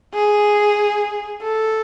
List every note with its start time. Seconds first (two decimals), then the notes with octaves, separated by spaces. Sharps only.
0.14 G#4
1.43 A4